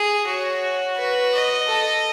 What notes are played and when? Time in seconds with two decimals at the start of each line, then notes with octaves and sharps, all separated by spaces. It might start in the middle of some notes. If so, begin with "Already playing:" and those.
Already playing: G#4
0.26 F#4 C#5
0.97 B4
1.33 D#5
1.68 A4